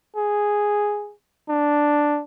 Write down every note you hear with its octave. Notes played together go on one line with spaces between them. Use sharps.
G#4
D4